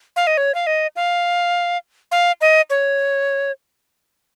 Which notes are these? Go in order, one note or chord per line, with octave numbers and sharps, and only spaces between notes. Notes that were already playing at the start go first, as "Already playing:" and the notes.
F5
D#5
C#5
F5
D#5
F5
F5
D#5
C#5